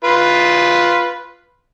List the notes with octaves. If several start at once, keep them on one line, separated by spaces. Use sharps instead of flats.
F4 B4